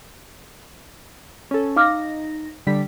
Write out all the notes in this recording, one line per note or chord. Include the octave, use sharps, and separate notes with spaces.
C#4 A4
D#4 F5 D6 F6 A#6
D3 G3 B6